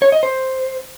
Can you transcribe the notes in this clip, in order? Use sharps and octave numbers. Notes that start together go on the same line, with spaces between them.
C#5
D#5
C5